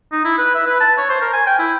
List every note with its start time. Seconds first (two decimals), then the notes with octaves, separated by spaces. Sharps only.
0.13 D#4
0.25 E4
0.38 B4
0.55 E5
0.67 B4
0.81 A5
0.98 C#5
1.10 C5
1.22 A#4
1.33 G#5
1.47 G5
1.59 E4